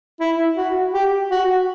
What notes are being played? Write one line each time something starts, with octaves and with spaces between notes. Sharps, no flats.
E4
F#4
G4
F#4